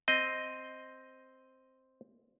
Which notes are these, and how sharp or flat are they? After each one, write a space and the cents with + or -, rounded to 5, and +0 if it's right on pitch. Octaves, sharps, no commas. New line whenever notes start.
C4 +0 D#5 +0